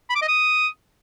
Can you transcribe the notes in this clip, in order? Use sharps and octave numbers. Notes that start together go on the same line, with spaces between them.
B5
D6
D#5
D#6